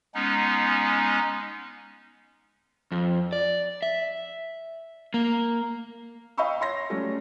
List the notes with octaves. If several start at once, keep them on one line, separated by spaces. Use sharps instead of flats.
G#3 B3 C#4 D#4
F2
D5
E5
A#3
D#5 F5 G5 B5 C#6 E6
C#5 C6 A#6
F#3 G3 A3 C#4 F#4